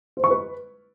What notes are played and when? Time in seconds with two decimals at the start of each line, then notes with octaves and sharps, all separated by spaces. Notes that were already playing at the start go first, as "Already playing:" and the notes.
0.17 C5
0.24 C#6
0.30 B4